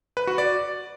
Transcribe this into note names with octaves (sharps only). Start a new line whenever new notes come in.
B4
F#4
D5